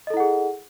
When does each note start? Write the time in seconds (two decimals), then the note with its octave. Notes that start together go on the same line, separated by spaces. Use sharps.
0.07 D#5
0.10 A4
0.14 E4
0.17 F#5
0.20 G#4